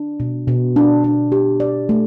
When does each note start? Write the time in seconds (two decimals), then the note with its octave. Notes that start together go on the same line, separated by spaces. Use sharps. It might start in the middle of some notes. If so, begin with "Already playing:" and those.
Already playing: D4
0.20 B2
0.48 B2
0.76 D4
1.04 D4
1.32 G4
1.60 D5
1.89 A3